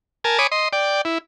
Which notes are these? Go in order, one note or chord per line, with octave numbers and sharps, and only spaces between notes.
A#4 G#5 A5
C#5 G#5 B5 D6 D#6
D#5 C6
D5 G5
E4